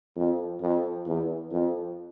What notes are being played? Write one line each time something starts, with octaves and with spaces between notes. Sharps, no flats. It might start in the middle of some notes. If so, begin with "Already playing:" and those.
F2
F2
E2
F2